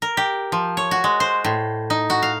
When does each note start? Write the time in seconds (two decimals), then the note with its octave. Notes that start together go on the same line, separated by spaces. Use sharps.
0.02 A#4
0.17 G4
0.52 F3
0.77 C#5
0.91 F#4
1.04 G#3
1.20 C5
1.44 A2
1.90 D#4
2.10 F#4
2.23 F5